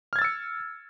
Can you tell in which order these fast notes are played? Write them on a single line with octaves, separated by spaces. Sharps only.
F6 G#6 A6 E6 C#7